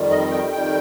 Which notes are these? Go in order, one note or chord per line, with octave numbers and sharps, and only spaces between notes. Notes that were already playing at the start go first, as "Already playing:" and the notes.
Already playing: F2 D#3 G3
D#5
G5
F2 D#3 G3 G5